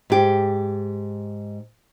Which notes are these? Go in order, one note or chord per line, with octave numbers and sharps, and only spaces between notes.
G#2 G4